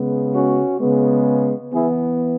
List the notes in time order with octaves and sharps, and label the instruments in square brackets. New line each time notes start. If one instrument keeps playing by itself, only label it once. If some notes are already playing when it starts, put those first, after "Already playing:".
Already playing: [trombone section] C#3 G#3 B3
C#4 F#4
C#3 G#3 B3
E3 B3 E4 G#4